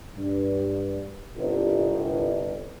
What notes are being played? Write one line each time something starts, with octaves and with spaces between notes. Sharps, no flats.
G2
G1 C2